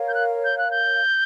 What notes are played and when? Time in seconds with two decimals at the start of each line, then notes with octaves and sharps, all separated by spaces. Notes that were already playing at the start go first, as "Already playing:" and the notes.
Already playing: A#4 C#5 F5
0.08 G6
0.14 F#6
0.44 G6
0.58 F#6
0.71 G6